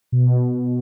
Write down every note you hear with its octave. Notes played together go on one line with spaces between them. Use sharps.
B2